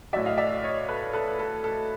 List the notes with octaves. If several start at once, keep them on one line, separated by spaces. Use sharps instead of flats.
A2 F#3 D5 E5
D#5 F5
D5 E5
C#5 D#5
A4 B4
A4 B4
A4
A4